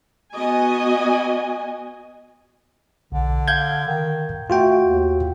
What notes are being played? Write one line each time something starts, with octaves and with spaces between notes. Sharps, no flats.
B3 F#4 D#5 G#5
B1 D3
F5 G6 G#6
D#3
A3 F4 F#4 G5
D#2